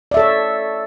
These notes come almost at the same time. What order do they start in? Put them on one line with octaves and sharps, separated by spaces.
D5 E5 A4 C#5